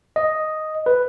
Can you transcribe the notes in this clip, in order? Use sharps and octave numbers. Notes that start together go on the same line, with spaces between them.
D#5
B4